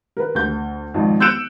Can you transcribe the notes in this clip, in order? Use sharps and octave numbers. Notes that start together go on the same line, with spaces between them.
A#4 B4
D2 G6
G#1 F2
E6 F#6 G6 C#7 D7 E7